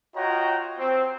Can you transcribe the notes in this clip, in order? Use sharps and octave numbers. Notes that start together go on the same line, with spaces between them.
F4 F#4 C#5 D#5 G5 A#5
C4